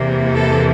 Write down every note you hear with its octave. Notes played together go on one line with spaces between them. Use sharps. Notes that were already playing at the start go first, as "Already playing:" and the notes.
Already playing: E2 C3 E3 A#3
A4